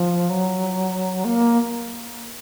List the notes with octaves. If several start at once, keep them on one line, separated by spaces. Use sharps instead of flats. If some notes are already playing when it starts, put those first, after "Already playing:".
Already playing: F3
F#3
A#3